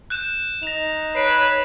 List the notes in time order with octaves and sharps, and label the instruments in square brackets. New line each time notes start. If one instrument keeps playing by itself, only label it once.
[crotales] F#6 G6 E7
[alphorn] D#4 [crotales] A#6 F7
[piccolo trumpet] B4 [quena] C#5 [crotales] C7 D7 E7